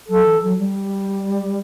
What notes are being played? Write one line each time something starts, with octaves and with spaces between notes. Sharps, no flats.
F#3 A4
E3
F#3
G3